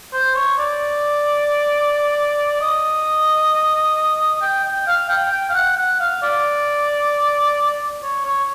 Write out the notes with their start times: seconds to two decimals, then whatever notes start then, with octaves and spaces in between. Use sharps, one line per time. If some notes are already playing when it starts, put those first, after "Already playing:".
0.13 C5
0.35 C#5
0.58 D5
2.61 D#5
4.42 G5
4.65 G5
4.87 F5
5.09 G5
5.32 G5
5.49 F5
5.54 F#5
5.77 F#5
6.00 F5
6.22 D5
8.03 C#5
8.25 C#5